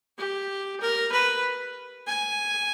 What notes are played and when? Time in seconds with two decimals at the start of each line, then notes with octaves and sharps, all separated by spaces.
0.18 G4
0.81 A#4
1.12 B4
2.07 G#5